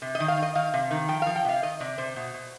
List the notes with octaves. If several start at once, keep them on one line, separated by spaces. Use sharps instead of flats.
C3
D#5
D#3
F5
D#3
D#5
D#3 F5
C3
D#3
F3 G5
F3 F5
G5
C3 F5
D#3 D#5
C3 D5
C3 C5
B2
B2